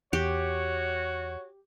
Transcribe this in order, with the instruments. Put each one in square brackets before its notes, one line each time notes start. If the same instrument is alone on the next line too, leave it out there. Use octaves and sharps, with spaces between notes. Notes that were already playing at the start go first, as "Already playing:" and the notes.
[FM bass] E2 [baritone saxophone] F#4 [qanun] G4 [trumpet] C#5